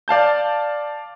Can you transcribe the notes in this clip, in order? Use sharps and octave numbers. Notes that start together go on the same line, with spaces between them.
D5 F5 A5 G6